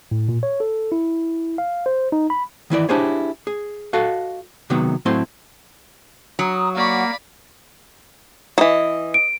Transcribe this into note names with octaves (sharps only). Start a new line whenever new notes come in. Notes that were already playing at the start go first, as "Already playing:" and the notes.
A2
A#2
C#5
A4
E4
F5
C5
D#4
B5
D#3 E3 E4 D5
D4 E4 G4 G#4 C5 C#5
G#4
F#4 A4 D#5 F5
C3 D#3 F#3 G#3 B3
A2 F#3 A3 C4 E4 C6
F#3 A#5 D#6
A#3 D5 F#5 B5 C#6
E3 F#3 D#5
D7